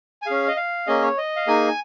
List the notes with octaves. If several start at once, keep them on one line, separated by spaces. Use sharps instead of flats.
G#5
C#4 G#4 F5
D#5
F5
A#3 C#4 G#4 D#5
C#5
D#5
F5
A#3 D#4 G#4 G#5